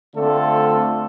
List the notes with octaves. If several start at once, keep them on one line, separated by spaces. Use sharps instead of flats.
D3 A3 C4 F4 A4